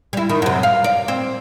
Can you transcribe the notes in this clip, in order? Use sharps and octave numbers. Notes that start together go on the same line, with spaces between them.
G3 E4
D#3
F#2 C3
F5
D5
C4